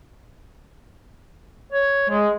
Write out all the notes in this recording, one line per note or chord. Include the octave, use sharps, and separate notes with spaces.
C#5
G#3